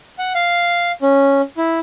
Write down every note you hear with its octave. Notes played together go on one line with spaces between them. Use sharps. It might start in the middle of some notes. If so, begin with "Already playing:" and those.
F#5
F5
C#4
E4